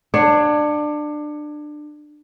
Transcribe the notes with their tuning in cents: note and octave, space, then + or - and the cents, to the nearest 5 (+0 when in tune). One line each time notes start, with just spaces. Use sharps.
D4 +25 C#5 +0 F#5 +0